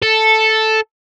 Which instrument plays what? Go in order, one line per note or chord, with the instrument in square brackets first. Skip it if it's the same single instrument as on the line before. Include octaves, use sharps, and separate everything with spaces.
[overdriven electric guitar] A4